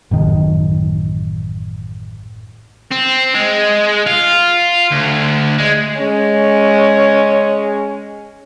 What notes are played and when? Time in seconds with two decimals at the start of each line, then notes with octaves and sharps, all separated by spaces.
0.11 A1 F#2 D#3
2.92 C4
3.34 G#3
4.07 F4
4.91 D2
5.58 G#3
5.97 G#3 C#4